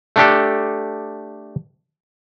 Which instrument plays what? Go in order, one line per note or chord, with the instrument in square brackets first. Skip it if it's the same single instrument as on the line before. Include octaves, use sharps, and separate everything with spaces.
[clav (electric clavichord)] A3 D4 G4 A4